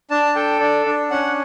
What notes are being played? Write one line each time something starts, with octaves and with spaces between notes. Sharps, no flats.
D4 A5
A4 G5
D4 D5
D4
C#4 F#5